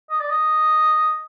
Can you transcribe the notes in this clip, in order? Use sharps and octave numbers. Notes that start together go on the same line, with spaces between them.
D#5
D5
D#5